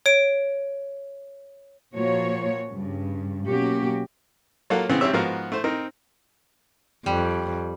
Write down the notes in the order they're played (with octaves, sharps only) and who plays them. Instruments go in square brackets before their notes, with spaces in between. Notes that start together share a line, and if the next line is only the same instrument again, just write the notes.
[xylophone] C#5 D7
[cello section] A#2 F3 A#3 F#4 C#5
G2 C#3
B2 F#3 A#3 C#4 F#4 G4
[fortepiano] F#3 A#3 F4 A4 F#5
C#3 E3 B3 C4
G#1 C4 G4 C#5 E5
G#2 F3 B3 F#4 A#4 F5
A3 C5
C4 D#4 A#4
[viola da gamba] F2 [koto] G3